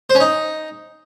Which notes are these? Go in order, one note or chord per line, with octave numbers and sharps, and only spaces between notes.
C5
C#4
D#4